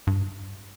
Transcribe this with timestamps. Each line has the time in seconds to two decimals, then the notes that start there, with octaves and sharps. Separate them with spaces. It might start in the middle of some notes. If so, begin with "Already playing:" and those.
0.07 G2